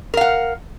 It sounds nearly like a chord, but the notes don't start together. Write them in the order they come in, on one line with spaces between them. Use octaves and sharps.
A#4 F5 F#5